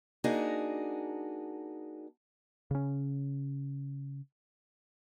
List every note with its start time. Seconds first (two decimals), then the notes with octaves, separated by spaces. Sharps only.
0.24 A#3 D4 D#4 F#4 G#4
2.71 C#3 C#4